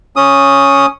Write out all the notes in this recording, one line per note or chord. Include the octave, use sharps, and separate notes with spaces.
C#4 D#6